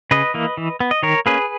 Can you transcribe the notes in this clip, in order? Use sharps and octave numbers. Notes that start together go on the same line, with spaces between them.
C#3 B4 D#5
E3 A#3
E3
B3
D#5
D#3 A#4 C#5
A#3 C#4 G#4 B4